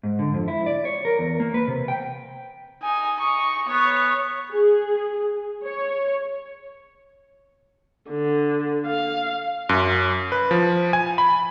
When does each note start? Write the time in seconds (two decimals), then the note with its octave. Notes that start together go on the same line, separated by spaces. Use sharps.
0.03 G#2
0.19 D3
0.34 F2
0.48 E4
0.66 D5
0.85 C#5
1.05 A#4
1.19 E2
1.40 A#3
1.54 B4
1.67 C3
1.88 G5
2.83 D#4 G#5
3.20 D#4 C#6
3.68 B3 C#5
4.53 G#4
5.65 C#5
8.09 D3
8.87 F5
9.69 F#2
10.32 B4
10.51 F3
10.93 G#5
11.18 B5